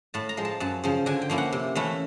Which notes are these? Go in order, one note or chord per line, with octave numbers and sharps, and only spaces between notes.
A2 A5
A#5
F3 G#3
A5
F#2 A5
C#3 F3
D3 G#5
G5
F3 A#3 C#4 E4
F#5
C3
E3 A3 C#4 E4